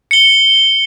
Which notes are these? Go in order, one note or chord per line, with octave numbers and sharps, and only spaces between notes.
C#7 G7